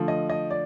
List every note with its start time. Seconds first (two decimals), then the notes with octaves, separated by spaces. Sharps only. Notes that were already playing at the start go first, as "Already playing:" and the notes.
Already playing: D3 F3 A3
0.08 D#5
0.30 D#5
0.50 D5